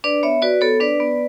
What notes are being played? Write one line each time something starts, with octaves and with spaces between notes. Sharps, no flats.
D4 B4 D5
B3 C#5 E5
F#4 B4 D5
B3 A4 C#5
D4 B4 D5
B3